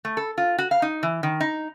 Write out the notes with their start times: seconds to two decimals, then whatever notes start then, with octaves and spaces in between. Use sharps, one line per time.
0.05 A3
0.17 A4
0.38 F4
0.58 F#4
0.71 F5
0.82 D#4
1.03 E3
1.23 D#3
1.41 D#4